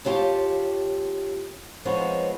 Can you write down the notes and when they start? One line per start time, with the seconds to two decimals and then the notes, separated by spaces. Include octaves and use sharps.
0.05 D#2 F4 G4 C#5 A5
1.85 F3 G#3 B3 C4 D#4 C#5